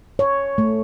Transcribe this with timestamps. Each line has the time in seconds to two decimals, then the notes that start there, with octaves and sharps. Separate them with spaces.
0.19 C#5
0.58 A3